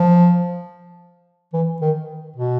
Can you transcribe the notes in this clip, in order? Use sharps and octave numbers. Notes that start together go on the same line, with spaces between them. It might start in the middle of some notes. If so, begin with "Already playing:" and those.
Already playing: F3
E3
D#3
B2